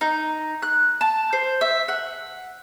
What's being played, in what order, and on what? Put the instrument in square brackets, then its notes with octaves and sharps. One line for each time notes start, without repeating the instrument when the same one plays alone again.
[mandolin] D#4
F#6
A5
C5
E5
F#5